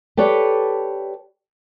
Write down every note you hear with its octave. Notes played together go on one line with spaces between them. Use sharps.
G4 A4 B4 C#5 D5